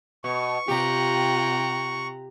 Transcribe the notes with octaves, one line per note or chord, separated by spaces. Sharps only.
B2 C#6
C3 F4 G4 G5 A#5 F#6